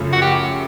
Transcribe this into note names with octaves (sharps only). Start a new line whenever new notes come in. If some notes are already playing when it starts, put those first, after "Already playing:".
Already playing: F#2 C#3 F3 A3
F#4
G4